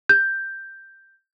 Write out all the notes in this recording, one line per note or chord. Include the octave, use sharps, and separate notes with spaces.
G6